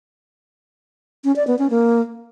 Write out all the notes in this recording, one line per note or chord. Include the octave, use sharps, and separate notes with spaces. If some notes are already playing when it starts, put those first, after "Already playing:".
C#4
D5
B3
C#4
A#3